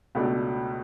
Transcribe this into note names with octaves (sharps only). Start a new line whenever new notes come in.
C#2 B2 A3 D4